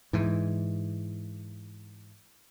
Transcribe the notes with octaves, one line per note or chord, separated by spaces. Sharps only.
G#2 E3